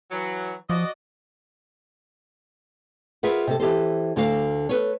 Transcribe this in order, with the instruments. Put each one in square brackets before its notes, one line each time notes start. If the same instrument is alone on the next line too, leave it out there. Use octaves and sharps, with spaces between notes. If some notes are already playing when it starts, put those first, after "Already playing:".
[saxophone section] E3 F#3
[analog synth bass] F3 [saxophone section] F#4 D5 D#5
[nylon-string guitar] F4 G#4 A#4 B4 E5 F#5
C3 A4
E3 G4 A4 C5
D2 D3 F#4 A4 F5
A4 B4 C#5